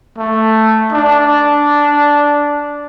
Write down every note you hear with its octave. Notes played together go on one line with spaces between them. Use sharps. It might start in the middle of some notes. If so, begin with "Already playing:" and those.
A3
D4